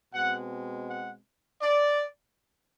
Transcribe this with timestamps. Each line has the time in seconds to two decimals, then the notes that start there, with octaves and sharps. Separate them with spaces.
0.14 B2 G#3 C4 F#5
0.89 F#5
1.62 D5